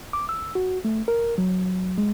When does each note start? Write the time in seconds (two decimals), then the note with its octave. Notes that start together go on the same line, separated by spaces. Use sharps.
0.13 D6
0.29 E6
0.55 F#4
0.85 A3
1.08 A#4
1.38 F#3
1.98 G#3